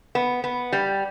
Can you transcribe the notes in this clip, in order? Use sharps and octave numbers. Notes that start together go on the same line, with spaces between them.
B3
B3
G3